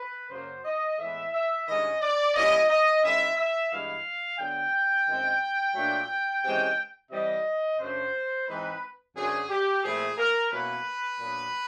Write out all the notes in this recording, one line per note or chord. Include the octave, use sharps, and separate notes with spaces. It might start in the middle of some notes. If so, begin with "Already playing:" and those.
Already playing: B4
F#2 C#3 F#3 A#3 C5
D#5
A2 E3 G#3 B3 E5
E5
G2 D#3 G#3 C#4 E4 D#5
D5
E3 G3 A#3 C#4 E4 D#5
D#5
D#3 G#3 C#4 E4 E5
E5
G2 E3 G#3 B3 E4 F5
D3 F#3 B3 G5
F#2 D#3 G#3 C4
A#2 F#3 A3 D4
C3 E3 G#3 C#4 G5
C3 E3 G3 D#5
F#2 C#3 F#3 A3 D4 C5
G#2 E3 G#3 C4 D#4 B4
F#2 D3 F#3 A3 C4 G#4
G4
A#2 F3 A3 C4 E4 G#4
A#4
B2 F#3 A#3 C#4 E4 B4
A#2 F#3 B3 D4